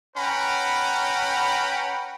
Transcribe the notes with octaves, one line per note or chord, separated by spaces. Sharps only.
C#4 B4 F#5 G5 A#5 B5